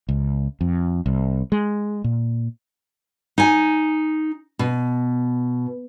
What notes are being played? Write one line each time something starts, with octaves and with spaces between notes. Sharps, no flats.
C#2
F2
C2
G#3
A#2
D#4 G#5
B2